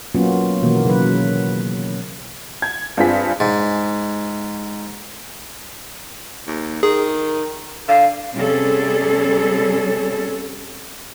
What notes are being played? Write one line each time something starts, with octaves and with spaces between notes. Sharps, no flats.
F#3 A#3 B3 C#4 F4
B2 D#3 E3 A#3 B3
C#3 F#3 B4
G#6
G2 C4 F4 G#4 B6
G#2
D#2
D#3 G#4
D3 F5
C3 G3 B3 C#4 G#4 A4